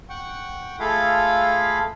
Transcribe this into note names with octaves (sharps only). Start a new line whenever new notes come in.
F#5 G5 C#6
A3 F4 G#4 A4 F5 B5